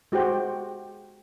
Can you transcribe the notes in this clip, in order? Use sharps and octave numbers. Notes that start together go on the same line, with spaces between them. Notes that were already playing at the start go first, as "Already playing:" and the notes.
G#3 F#4 G4 C5 G5